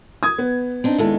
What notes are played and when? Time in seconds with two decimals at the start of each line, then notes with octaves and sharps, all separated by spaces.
0.23 D#6 G#6
0.38 B3
0.84 C4 D4 D#4
0.98 D#2 G#3 B3 E4 A4